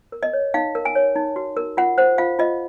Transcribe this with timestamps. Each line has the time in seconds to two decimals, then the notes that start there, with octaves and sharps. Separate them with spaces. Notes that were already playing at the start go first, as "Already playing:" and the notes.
0.12 A#4
0.23 D#5
0.33 C#5
0.54 D#4 F5
0.75 A#4
0.85 G#5
0.95 C#5
1.16 D#4
1.36 F#4
1.57 A#4
1.77 F4 F#5
1.98 C5 F#5
2.18 F4 F5
2.39 F4 D#5